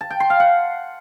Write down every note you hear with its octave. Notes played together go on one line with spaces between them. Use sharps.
A5
G5
C6
F5
F#5